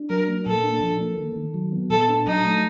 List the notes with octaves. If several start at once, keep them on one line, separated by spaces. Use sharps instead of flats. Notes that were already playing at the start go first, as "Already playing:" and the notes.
Already playing: D4
F#3 A#4
A#3
A#2 A4
D4
F3
A#3
D#3
D#3
F#3
B3
A#2 A4
D4
F#3 D#4
A3